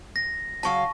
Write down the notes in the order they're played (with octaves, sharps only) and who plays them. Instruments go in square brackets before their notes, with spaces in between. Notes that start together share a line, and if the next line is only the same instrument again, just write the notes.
[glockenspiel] A#6
[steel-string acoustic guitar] C#3 F#3 F5 [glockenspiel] A5 C#6